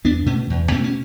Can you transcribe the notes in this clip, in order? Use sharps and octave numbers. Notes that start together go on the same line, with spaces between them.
E2 B3 D4
B2 A3 C#4
E2
B2 A3 C#4
C#4